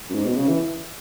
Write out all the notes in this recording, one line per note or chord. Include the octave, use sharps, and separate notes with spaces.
F#2
G#2
B2
C#3
E3